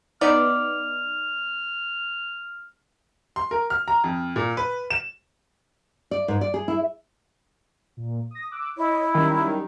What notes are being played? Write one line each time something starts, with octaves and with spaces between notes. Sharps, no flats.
B3 D#4 D5 F6
C6
A#4
F6
A#5
F2
A#2
B4
E7
D5
G#2
D5
G#4
E4
A#2
D#6 A#6
D6 E6 F#6
E4 C#5 D#5
D#3 F#3 G3 C#4